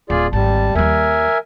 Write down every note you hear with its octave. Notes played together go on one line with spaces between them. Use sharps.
D1 F4 G#4 D5
G#1 G3 C4 A5
D#2 G3 A#4 E5 G#5